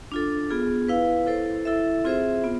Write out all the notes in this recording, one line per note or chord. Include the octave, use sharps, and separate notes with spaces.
D4 F4 A4
B3 F4 G#4
E4 B4 F5
E4 A4 C5
E4 A4 E5
C4 F4 G#4 C5 E5
B3 F4